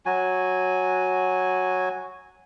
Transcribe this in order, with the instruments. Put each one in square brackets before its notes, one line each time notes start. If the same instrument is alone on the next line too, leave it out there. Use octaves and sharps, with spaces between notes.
[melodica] F#3 F#4 G#5